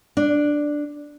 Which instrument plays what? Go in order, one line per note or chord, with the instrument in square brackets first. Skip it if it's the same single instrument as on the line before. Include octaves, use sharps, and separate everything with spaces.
[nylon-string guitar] D4